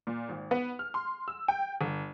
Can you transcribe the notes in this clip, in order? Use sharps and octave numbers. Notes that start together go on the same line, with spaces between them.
A#2
G#1
B3
F6
C6
E6
G5
G1